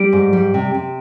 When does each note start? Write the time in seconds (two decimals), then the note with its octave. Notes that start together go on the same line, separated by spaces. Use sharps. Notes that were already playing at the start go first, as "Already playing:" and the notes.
Already playing: G3 D7
0.13 G#2
0.33 G3
0.54 C3
0.74 C3